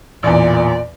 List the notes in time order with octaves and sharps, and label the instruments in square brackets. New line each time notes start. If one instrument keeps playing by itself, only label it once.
[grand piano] A1 E2 [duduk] A#2 [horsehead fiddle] D5